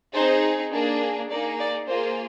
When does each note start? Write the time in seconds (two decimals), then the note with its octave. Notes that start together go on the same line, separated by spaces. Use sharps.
0.14 C4 D#4 G#4 C5
0.73 A#3 D4 G#4
1.30 A#3 D#4 G#4 D5
1.59 D5
1.88 A#3 F4 G#4 C5